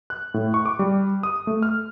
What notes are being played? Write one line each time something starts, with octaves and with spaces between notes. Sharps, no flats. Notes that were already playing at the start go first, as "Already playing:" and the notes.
F#6
A2
C#6
D6
G3
D#6
A3
F6